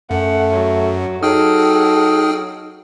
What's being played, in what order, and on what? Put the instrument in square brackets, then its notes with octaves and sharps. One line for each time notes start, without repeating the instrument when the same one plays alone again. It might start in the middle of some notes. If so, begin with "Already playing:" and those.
[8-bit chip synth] F#2 [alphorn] A3 [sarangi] F#5
[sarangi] F#3
[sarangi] F#3 [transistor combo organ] D#4 [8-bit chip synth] G#4 G5 F6 [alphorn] A4